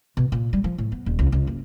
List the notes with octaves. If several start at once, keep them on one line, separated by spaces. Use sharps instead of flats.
B2
A#2
G3
F3
A2
B3
D#1
C#2
C#2
F#1